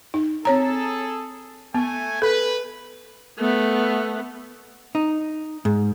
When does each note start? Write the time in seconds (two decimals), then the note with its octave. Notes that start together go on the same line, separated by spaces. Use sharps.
0.14 D#4
0.45 C4 G#4 A4 C#5 A#5
1.75 A3 B3 G#5
2.22 A4 B4
3.39 A3 B3
4.95 D#4
5.65 G#2